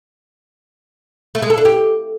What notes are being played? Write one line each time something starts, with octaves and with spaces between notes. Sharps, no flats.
A3
G#3
A4
D4
G4